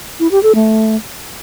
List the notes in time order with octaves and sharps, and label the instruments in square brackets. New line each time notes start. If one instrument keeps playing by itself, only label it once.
[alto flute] E4
G4
A4
A3